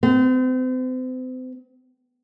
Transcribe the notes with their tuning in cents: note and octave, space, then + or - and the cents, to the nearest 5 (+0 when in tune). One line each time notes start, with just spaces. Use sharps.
C4 -40